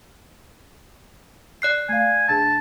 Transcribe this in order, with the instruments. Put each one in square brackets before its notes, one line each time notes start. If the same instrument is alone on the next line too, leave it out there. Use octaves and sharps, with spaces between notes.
[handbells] D5 F#6 C7
[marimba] A3 F5 [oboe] G#5
[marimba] B2 D4 G#4 [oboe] A5